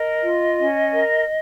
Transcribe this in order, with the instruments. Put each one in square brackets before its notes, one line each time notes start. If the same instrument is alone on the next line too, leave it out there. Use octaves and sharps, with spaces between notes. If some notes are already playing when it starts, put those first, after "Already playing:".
Already playing: [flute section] A#4 D#5
F4
C#4
A#4